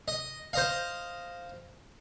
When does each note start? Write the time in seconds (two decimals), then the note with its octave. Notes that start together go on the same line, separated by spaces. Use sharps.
0.08 D#5
0.53 C5 D#5 F5